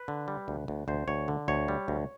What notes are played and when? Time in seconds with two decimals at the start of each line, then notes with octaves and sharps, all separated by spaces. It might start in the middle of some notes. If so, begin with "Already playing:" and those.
Already playing: B4
0.08 D3
0.28 G3
0.48 D2
0.68 D2
0.88 D2 C5
1.08 D2 C#5
1.28 D3
1.48 D2 C#5
1.68 G3
1.88 D2